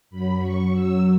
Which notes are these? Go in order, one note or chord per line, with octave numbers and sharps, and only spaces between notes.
F#2 F#3 B5
C#6
E6